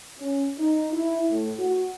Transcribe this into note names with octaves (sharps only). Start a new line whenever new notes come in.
C#4
D#4
E4
A2
F#4